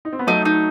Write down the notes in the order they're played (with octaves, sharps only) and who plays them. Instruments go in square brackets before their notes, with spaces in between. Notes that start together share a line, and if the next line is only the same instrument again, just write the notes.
[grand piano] D#4
C4
B3
[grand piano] F#3 A3 [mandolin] D#4
[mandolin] D#4